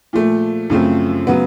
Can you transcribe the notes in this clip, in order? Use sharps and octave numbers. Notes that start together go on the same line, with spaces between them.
A#2 F3 A3
F#2 C#3 F3 A3 C4
C#3 F#3 B3